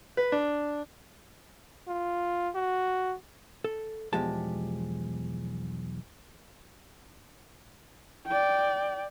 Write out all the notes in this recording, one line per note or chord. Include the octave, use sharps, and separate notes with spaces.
B4
D4
F4
F#4
A4
B1 E2 F3 G#3 G4 A5
D5 G5